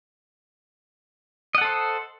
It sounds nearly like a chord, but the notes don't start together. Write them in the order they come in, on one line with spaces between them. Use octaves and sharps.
D#5 F#5 A4 C5